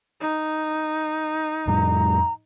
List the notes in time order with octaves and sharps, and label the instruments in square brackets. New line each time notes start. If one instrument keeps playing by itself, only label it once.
[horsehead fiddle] D#4
[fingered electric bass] F2 A2 G3 [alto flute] A#5